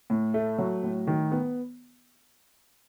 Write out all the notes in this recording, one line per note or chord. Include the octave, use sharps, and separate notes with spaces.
A2
A3
F#3
A2
D#3
B3